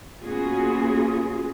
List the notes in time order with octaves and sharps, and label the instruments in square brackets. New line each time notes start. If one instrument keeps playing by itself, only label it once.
[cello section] A#3 B3 C#4 F4 F#4 G#4